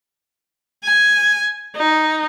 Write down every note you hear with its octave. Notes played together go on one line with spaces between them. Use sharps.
G#5
D#4